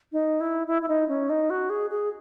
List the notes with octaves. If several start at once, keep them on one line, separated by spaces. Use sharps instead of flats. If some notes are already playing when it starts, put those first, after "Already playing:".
D#4
E4
E4
E4
D#4
C#4
D#4
F#4
G#4
G#4